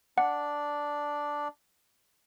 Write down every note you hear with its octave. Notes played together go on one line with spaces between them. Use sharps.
D4 D5 F#5